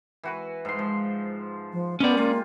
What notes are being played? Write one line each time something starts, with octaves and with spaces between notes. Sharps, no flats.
E3 F#4 B4
G#2 C6
F3
F3
G#3 A#3 B3 C#4 G4 D5
A#3 F4